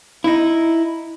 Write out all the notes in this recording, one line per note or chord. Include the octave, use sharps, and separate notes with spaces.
D#4 E4